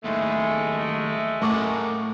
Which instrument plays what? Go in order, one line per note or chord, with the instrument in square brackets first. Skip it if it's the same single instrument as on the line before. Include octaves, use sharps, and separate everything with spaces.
[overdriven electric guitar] D#2 A2 [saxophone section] G#3 A3
[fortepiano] A2 C#6 D6 [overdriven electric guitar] A#3 F#5